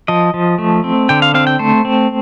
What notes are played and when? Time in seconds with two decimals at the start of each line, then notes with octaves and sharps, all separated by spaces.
0.08 F3 D#5
0.34 F3
0.58 A3
0.84 C4
1.09 D3 G5
1.22 F5
1.34 C4 F5
1.47 G5
1.59 A3 C5
1.85 C4